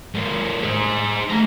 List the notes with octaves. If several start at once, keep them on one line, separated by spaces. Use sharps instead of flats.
G#2 A#3
G#4 C5
A3 A#5